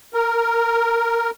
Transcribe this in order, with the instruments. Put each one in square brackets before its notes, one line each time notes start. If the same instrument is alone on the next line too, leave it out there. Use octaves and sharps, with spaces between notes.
[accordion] A#4